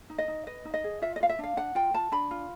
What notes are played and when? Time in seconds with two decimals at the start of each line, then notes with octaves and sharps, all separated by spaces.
0.10 D#4
0.18 D#5
0.28 D#4
0.47 B4 D#5
0.65 D#4
0.74 D#5
0.84 G#4
1.02 F4 E5
1.16 D#5
1.20 F4 F5
1.29 E5
1.39 D4 F5
1.57 D4 F#5
1.75 F4 G5
1.94 F4 A5
2.12 D4 B5
2.31 F4